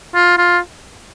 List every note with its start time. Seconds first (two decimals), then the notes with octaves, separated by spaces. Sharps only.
0.15 F4
0.38 F4